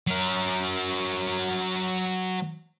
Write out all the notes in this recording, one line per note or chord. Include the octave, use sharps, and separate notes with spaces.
F#3 A#4